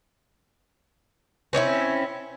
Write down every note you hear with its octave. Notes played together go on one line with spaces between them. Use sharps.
C4 C#4 D#4 E4